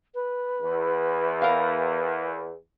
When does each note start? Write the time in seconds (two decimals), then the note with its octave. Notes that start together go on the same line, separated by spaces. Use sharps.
0.15 B4
0.62 E2
1.42 A#4 F5